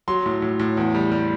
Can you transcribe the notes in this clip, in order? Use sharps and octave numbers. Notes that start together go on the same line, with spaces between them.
F#3 C6
A2
A2
A2
E2
G3
G3